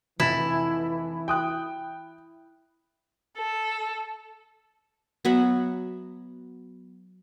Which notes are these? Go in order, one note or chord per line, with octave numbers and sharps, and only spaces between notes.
F1 E3 E4 A6
G5 D#6 F#6
A4
F#3 B3 E5 F#5